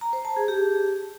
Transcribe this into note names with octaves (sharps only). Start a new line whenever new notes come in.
A#5
C5
A5
G#4
G4